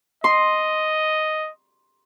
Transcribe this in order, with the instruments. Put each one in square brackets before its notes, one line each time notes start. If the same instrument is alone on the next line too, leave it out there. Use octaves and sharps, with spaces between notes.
[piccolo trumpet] D#5 [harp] C6